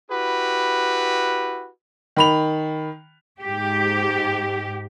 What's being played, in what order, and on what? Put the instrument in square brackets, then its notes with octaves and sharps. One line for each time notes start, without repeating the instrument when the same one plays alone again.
[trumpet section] E4 F#4 G4 B4
[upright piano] D#3 B5 F7
[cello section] G#2 G4